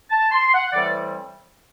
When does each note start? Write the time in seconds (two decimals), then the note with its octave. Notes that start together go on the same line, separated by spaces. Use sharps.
0.10 A5
0.32 C6
0.52 F#5
0.72 A2 E3 G3 C4 E4 D5
0.82 B4